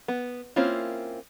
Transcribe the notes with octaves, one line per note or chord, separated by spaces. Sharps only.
B3
A#3 C4 C#4 E4 F4